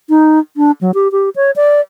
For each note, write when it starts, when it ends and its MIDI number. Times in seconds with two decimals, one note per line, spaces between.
0.09 0.39 63
0.57 0.71 62
0.81 0.91 54
0.94 1.11 67
1.12 1.30 67
1.36 1.51 73
1.56 1.81 74